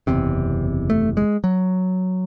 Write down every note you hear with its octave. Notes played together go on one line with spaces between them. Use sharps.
F#1 E2 C3 C4
A3
G#3
F#3